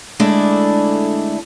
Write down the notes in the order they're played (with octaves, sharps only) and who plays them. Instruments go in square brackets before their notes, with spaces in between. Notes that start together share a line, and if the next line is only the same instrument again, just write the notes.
[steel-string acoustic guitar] D3 G#3 A3 D4 E4